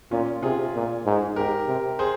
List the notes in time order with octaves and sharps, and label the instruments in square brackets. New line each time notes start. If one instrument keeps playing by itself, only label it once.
[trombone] A#2 [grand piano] C#4 F4
[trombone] C3 [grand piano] F4 G#4
[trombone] A#2
G#2
[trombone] G#2 [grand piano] G4 A#4
[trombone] C3
[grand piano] G#4 C5